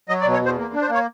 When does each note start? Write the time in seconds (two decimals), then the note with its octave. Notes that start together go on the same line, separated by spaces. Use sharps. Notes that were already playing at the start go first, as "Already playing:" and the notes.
0.09 F#3 D#5
0.21 D5
0.25 B2
0.33 C#5
0.41 E2 C5
0.58 A#3
0.73 D4
0.82 C5
0.89 A#3 C#5